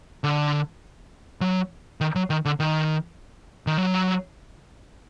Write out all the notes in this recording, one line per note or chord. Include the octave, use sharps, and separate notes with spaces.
D3
F#3
D#3
F#3
D#3
D3
D#3
D#3
F#3